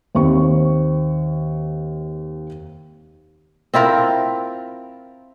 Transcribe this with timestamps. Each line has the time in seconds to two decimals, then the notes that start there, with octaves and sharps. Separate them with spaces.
0.15 D#2 C4 C#6
3.74 C4 E4 F4 A#4